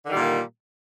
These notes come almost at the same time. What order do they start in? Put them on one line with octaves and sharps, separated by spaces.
D3 D#3 G3 A#2 A#3